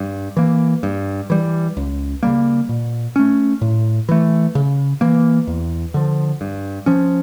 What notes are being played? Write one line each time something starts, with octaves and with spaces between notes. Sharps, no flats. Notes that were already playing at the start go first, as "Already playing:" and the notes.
Already playing: G2
E3 A#3
G2
E3 G3
C#2
C#3 G3 A#3
A#2
A3 C#4
A2
E3 A3
C#3
E3 A#3
E2
D3 F3
G2
F3 C#4